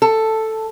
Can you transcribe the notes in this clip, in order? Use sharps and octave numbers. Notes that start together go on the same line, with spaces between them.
A4